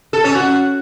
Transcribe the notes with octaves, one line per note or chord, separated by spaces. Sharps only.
A4
C#4
F#4